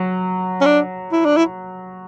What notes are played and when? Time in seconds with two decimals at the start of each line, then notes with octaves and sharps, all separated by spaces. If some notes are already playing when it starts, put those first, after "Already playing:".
Already playing: F#3
0.61 C#4
0.66 D4
1.12 E4
1.25 D4
1.37 E4